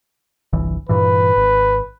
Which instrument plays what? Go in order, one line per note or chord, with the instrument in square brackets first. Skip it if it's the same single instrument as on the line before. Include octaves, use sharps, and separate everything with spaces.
[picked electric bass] G1 C2 E3
[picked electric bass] G2 A#2 E3 [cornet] B4
[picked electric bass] G#1